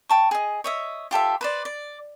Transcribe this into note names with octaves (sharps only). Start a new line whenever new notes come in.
G5 A5 C#6
G#4 D#5
C#5 D#5 E5
F4 G4 A4 E5
B4 C5 D5
D5